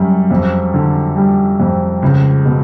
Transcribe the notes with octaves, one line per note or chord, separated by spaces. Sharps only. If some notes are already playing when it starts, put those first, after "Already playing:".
Already playing: F#2 G3
F2
D3
G3
F2
C#2
B2